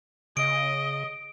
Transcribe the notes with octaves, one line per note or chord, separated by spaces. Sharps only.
C#3 D#5 D7